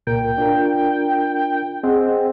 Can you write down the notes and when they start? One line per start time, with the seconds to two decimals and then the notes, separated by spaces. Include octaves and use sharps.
0.07 C2 A#2 A#4 G5
0.38 D4 F4 A#4
1.83 C4 G#4 D#5 F#5